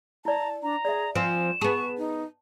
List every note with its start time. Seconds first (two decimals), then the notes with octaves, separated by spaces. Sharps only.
0.25 E4 D5 A5 A#5
0.63 D4 A#5
0.85 G#4 D5 E5
1.15 F3 C4 G#5 E7
1.61 B3 G#4 A5 C#6
1.98 D#4